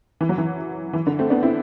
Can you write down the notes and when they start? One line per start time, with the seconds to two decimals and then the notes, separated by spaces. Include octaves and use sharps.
0.21 E3
0.29 F#3
0.38 E3
0.93 E3
1.07 D3
1.19 A3 C4
1.30 B3 D4
1.43 C4 E4